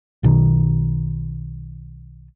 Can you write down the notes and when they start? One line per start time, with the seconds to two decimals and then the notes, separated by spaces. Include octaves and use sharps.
0.23 B1 B2 D#3